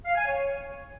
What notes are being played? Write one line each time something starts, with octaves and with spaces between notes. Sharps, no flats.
F5
G#5
C#5